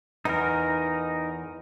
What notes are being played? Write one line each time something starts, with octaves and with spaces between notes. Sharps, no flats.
E2 D#4 A#4